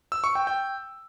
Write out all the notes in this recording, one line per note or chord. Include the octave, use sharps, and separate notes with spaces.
E6
C#6
G5
G5